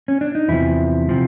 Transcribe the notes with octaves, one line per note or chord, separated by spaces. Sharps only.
C#4
D4
D#4
E2 C3 F3 E4
C3 F3